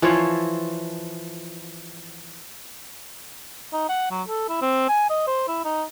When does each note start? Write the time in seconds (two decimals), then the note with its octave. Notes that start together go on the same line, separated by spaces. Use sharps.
0.02 E3 F3 F4 C#5
3.73 D#4
3.89 F#5
4.11 F#3
4.28 A4
4.49 E4
4.61 C4
4.89 G#5
5.10 D#5
5.27 C5
5.48 E4
5.65 D#4